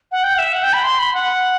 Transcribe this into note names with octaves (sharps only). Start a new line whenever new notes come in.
F#5
G5
F#5
E5
F#5
G5
B5
C6
B5
F#5